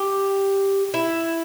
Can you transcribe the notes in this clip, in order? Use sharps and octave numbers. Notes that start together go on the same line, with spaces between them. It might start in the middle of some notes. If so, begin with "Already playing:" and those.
Already playing: G4
E4